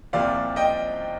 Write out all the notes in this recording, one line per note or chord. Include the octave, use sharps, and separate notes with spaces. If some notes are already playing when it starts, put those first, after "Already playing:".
C2 A#2 F3 C4 D5 F5
D#5 G5